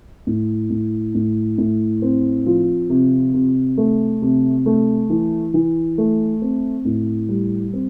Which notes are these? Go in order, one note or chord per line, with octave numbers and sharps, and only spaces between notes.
A2
A2
A2
A2
C4
F3
C3
C3
A3
C3
A3
E3
E3
A3
C4
A2
G3
C4